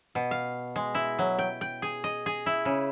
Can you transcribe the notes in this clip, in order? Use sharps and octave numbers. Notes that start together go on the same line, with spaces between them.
B2
F5
G#3
E4
F#3
G5
G5
G#4
D#5
G#4
E4
C#3